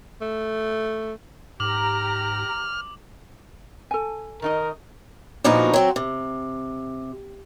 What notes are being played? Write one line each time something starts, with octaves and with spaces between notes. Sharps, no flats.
A3
G#2 G4 A#5 D6 F6 F#7
A4 G#5
D#3 D#4 A#4 D#5
A#2 D3 F3 B3 D#4 F#4
F#3 C4 F#4
C3